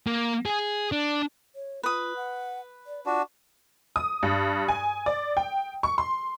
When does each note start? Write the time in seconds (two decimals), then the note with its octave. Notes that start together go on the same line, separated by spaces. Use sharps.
0.07 A#3
0.46 G#4
0.92 D4
1.55 C#5
1.83 F4 B4 D#6
2.16 F#5
2.87 D5
3.06 D4 F4 F#4
3.96 D#6
4.23 G2
4.68 G#5
5.06 D5
5.37 G5
5.83 C#6
5.98 C6